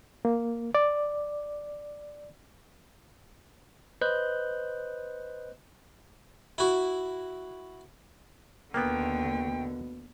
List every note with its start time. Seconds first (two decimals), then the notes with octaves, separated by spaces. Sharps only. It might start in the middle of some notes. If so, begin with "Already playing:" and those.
0.25 A#3
0.75 D5
4.01 B4 C5 D#5 F#6 G6
6.58 E4 F#4
8.74 D#2 B2 D3 A#3 B3 G5